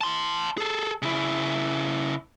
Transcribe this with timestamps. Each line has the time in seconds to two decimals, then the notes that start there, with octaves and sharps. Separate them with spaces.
0.01 A5 C6
0.58 G#4 A4
1.02 C#3 E4